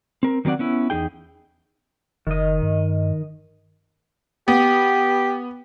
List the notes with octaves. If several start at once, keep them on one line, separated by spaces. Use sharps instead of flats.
C4 A#4
D#3 F#3 C4 D5 F#5
B3 C#4 E4
E2 D#4 G#4 G5
F#1 D#3 D#5
G2
B3 G4